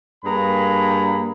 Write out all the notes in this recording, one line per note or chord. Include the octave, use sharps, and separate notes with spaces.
G2 A#3 G#4 A#5 B5